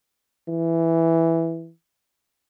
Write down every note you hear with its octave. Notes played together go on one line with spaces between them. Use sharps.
E3